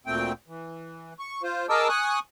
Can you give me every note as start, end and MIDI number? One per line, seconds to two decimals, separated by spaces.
0.06 0.32 38
0.06 0.32 46
0.06 0.32 57
0.06 0.32 60
0.06 0.32 79
0.48 1.13 52
1.19 1.42 85
1.43 1.66 65
1.43 1.66 72
1.69 1.88 68
1.69 1.88 70
1.69 1.88 75
1.69 1.88 81
1.69 1.88 86
1.69 1.88 88
1.89 2.19 80
1.89 2.19 85
1.89 2.19 87
1.89 2.19 90